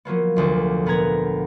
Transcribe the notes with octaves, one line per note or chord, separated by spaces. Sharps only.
F3 F#3 A#3 B3
F1 D2 F4
A#2 B3 B4 A#5 G#6